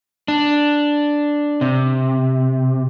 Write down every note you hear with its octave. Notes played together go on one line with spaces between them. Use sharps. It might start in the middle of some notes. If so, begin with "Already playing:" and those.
D4
C3